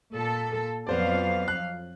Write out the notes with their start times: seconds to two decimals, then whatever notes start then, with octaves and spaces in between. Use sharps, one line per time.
0.15 A#2 A4
0.87 F2 F#3 B3 C5 D5 F5
1.48 F#6